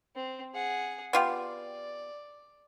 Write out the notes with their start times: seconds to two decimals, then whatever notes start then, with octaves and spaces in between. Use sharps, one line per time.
0.16 C4
0.54 G#4 F#5
1.13 B3 F4 G4 D5